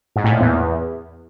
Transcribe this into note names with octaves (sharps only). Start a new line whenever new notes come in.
G#2
A2
A#2
E2